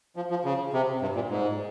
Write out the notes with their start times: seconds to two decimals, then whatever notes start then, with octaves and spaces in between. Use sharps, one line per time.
0.16 F3
0.30 F3
0.45 C#3
0.73 C3
1.02 G2
1.15 A#2
1.30 G#2